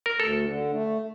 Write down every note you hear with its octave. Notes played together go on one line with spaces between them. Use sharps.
A#4
D2 A4
D3
A3